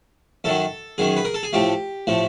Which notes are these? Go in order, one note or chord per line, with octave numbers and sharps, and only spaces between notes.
F#2 D#3 F#3 A4
F#2 D#3 F#3 G#4
B4
A#4
A4
G#4
A2 F3 A3 G4
A2 F3 A3